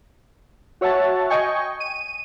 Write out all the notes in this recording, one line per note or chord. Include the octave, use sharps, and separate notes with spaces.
F#4 C#5 E5 F#5 A5
D#5 G5 G#5 C#6
D#7